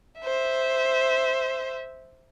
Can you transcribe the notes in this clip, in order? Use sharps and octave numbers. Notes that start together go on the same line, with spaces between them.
C5 E5